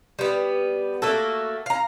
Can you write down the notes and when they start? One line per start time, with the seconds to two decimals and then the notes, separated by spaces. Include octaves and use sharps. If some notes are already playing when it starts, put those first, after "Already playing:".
0.19 G3 B3
1.02 A3 A#3 F#4 A4
1.66 F5 A#5